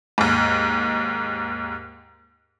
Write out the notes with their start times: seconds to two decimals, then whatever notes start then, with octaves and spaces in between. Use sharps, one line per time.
0.18 D#2 G#2